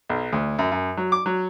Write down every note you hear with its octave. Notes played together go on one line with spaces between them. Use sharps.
B1
D2
F#2
F#2
F#3
D6
F#3